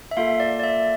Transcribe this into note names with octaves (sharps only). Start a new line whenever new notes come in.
E5
A#3 F4 A4 F5
D5
D5
E5